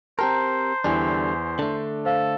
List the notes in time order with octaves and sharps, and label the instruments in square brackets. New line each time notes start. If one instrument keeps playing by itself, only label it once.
[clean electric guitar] C4 G4 A#4 [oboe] C5 [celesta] A5 A#5
[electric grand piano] E2 E4 [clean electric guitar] D3 G3 D4 [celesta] G#5
[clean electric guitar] D3 A3 [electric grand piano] D4
[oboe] A4 [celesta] C5 F5